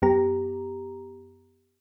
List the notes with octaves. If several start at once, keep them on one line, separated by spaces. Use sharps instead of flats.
F#2 B3 G4 A#5